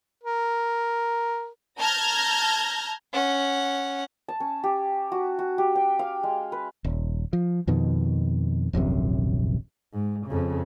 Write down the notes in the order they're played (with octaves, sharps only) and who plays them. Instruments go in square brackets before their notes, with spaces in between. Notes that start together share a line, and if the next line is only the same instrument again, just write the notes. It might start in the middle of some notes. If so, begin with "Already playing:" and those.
[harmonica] A#4
[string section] A5 A#5 F6 G6 G#6 A#6
[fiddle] C#4 F#5
[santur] A5
C#4
G4
F#4
F#4
G4
G5
F5
G#3
B4
[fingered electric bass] D#1
F3
F2 B2 D#3
D#1 A#1 F#2 C3
[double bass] G#2
F2 C#3